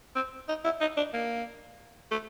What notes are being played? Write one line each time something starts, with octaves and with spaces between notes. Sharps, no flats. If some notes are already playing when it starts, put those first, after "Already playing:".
C4
D#4
E4
D#4
D4
A#3
A3